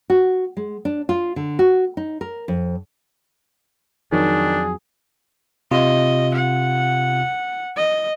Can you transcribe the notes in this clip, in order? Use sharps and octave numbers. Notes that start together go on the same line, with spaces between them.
F#4
G#3
D4
F4
D3
F#4
D#4
A#4
F2
F2 D#3 F#3 D4 G#4
C3 F4 D#5
F#5
D#5